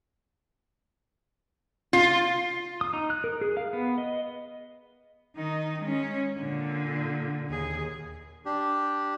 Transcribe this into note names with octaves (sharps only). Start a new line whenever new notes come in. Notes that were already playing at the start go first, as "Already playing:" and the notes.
F4
D#6
D#4
F#6
A#4
G#4
F5
B3
D#5
D#3 D#4
G#3 C#4
A#2 D3
D#2 G#4
D4 G4